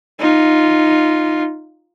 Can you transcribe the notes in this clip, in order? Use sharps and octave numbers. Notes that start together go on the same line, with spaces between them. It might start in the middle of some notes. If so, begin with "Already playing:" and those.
D#4 F4